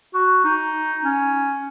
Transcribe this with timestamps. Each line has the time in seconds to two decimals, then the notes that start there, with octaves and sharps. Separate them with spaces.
0.14 F#4
0.44 D#4
1.03 C#4